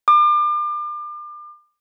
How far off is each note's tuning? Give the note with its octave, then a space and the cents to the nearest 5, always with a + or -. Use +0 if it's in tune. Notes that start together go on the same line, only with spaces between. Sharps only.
D6 +35